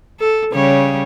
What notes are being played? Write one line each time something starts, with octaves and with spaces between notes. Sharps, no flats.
A4
C#3 G3 C#5